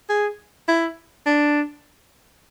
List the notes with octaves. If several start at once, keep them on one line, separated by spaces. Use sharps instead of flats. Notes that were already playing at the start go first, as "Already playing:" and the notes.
G#4
E4
D4